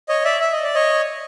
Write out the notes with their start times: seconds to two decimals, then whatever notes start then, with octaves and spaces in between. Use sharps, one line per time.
0.09 C#5 D#5
0.25 D5 E5
0.41 E5
0.52 D#5
0.63 D5
0.74 C#5 D#5